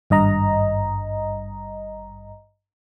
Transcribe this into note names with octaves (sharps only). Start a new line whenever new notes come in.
G#1 G2 D#5 A#5